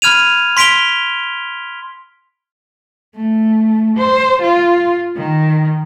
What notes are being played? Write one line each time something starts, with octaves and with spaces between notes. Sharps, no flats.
B5 F6 G#6 D#7 F7
C6 B6 D7 F7 G7
A3
C5
F4
D#3